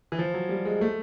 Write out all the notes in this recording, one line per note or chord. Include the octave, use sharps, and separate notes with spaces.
E3
F3
F#3
G3
G#3
A3